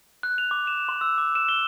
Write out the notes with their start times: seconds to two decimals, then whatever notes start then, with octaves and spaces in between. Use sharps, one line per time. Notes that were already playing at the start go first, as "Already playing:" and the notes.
0.23 F#6
0.38 F7
0.51 D6
0.67 E7
0.89 C6
1.01 E6
1.18 D6
1.35 E7
1.49 G7